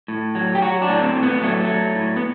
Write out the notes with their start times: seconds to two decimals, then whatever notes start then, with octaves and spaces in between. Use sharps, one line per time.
0.08 A2
0.35 F#3
0.55 G4
0.62 F#3 F#4
0.82 D4
0.88 A2
1.02 C4
1.16 A2
1.23 B3
1.42 F#3 A3
1.61 A3
1.68 F#3
1.95 A2
2.16 B3